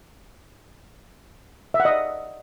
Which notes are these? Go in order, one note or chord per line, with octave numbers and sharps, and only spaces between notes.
E5
F#5
D#5
D5